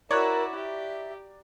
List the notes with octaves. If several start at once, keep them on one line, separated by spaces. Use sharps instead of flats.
E4 F#4 A#4 C#5 D5 A#5 E6 F#6
G4 E5